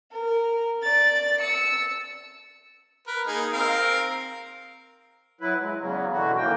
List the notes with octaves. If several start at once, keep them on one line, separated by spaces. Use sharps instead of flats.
A#4
D5 A6
E6 C#7
A#4 B4
A#3 D#4 G#4
C4 A#4 F5
F#3 E4 B4
G#3
E2 C#3 F#3
B2 D3 E3 F#4
A2 D#3 E3 A#3 G5